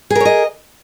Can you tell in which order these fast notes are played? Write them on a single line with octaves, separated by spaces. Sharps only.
G#4 A#4 C#5 D#5